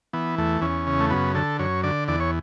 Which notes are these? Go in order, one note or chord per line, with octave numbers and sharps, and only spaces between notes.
E3 B3
E2 A3
E2 C#4
C#3
A3
F#2 B3
D3 A4
F#2 C#5
D3 D5
E2 D5
C#5